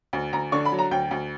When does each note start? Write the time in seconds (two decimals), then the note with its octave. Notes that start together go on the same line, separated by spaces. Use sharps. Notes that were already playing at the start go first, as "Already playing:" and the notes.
0.13 D2
0.33 D2 A#5
0.52 D3 C#6
0.65 B5
0.72 F#3
0.79 A#5
0.91 D2 G5
1.11 D2